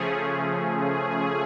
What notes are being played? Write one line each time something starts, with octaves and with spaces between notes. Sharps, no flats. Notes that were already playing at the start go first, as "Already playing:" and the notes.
Already playing: C#3 F3 A3 C#4 G#4
G#4